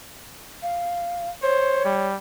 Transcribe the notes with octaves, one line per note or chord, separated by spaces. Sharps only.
F5
C5 C#5
G3